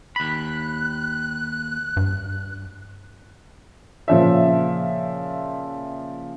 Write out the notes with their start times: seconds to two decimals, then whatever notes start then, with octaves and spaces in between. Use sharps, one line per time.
0.16 D#2 B5 F#6
1.97 G2
4.08 A#2 C#3 F3 C#5 E5